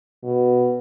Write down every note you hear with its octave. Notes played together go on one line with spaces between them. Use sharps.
B2